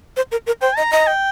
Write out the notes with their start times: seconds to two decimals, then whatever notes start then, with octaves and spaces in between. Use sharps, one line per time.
0.17 C5
0.32 A#4
0.46 A#4
0.61 C5 G5
0.77 D#5 A#5
0.91 D#5 A#5
1.07 G5